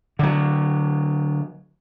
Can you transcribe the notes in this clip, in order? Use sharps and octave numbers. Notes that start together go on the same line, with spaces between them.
D3 F#3